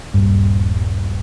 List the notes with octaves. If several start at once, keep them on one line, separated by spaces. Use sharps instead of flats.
D#1 G2